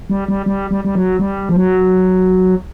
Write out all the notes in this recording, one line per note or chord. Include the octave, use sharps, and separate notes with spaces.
G3
G3
G3
G3
G3
F#3
G3
F3
F#3